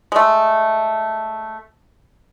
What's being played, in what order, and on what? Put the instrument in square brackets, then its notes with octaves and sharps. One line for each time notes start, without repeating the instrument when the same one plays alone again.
[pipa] G#3 A3